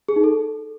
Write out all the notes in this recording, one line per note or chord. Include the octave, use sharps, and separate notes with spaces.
G#4
D#4
A4